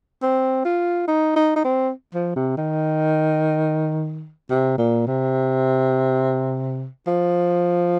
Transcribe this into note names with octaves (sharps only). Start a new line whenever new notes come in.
C4
F4
D#4
D#4
D#4
C4
F3
C3
D#3
C3
A#2
C3
F3